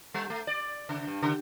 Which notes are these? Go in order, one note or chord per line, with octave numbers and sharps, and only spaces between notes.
G3
A3
D5
C#3
G2
C#3